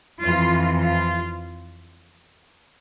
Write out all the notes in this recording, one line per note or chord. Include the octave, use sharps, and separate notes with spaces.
F2 E3 F4
F4